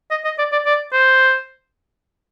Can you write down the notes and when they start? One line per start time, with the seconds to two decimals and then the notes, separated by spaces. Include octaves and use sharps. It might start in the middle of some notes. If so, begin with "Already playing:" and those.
0.11 D#5
0.25 D#5
0.38 D5
0.52 D5
0.66 D5
0.93 C5